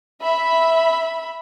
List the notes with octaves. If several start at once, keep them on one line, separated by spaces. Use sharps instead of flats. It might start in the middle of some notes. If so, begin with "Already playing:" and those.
E5 B5